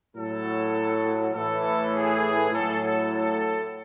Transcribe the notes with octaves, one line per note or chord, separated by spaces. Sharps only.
A2 F#3 A4
A2 E3 A4
G#4
A2 F#3 A4
A4
A4